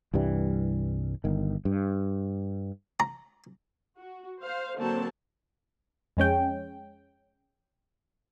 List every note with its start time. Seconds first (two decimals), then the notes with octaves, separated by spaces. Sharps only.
0.14 C2 G2 E3 G3
1.24 G1 D#3
1.65 G2
3.00 A#5
3.98 F#4
4.41 C5 F5
4.77 D3 F#3 A#3 C4 A4 A5
6.17 F2 G#3 C#4 G5